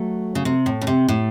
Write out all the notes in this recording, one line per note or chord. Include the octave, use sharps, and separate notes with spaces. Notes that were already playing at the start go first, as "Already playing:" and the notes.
Already playing: F#3 A3
C#3
C3
A2
C#3
C3
A2